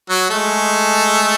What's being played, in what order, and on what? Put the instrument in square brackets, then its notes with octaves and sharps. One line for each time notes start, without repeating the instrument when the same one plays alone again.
[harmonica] F#3 F#4
[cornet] G#3 [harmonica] A3 A4